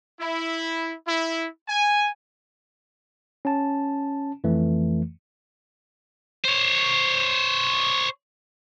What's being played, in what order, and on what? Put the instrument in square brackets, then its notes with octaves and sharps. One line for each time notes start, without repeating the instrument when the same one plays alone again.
[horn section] E4
E4
G#5
[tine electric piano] C#4 A5
F2 E3 A3
[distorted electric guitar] C5 C#5